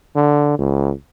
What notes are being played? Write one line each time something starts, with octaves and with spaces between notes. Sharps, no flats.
D3
C#2